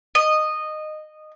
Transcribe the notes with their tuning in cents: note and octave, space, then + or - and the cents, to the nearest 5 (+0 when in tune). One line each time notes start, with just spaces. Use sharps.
D#5 -15